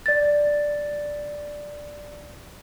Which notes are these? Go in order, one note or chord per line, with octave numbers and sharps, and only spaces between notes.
D5 A6